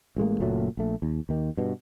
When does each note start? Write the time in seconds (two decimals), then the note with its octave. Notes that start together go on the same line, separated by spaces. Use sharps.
0.16 A1 A2 G#3 A#3
0.40 F#1 A#2 F#3 A3
0.77 A#1 A3
1.02 D#2
1.29 D#2 D#3
1.57 G2 B2